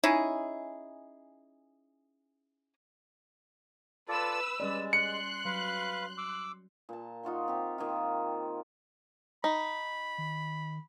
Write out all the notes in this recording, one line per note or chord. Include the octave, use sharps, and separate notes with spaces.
C#4 D#4 E4 G#4
F4 A4 B4 D5 E6
G3 G#3 C#4 D5
C6 F#6 C#7
F#3 B4 F5
D6 E6
A#2 A5
D#4 F4 F#4 C6
C4 G4
D#3 A#3 F4
D#4 B5
D#3